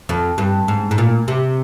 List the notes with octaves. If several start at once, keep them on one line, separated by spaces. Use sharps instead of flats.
F2
G2
G#2
G#2
A#2
C3